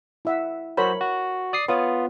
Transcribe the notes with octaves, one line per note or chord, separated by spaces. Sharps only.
E4 E5 F#5
F#3 F#4 A#4 C5 C#5 B5
F#4
D5 D#6 C7
B3 F4 B4 C#5 D#6